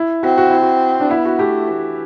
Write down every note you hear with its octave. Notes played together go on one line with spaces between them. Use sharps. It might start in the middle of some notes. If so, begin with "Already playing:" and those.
Already playing: E4
C4 F#4
F#4
E4
F#4
D4
B3 E4
F#4
A3 G4
E3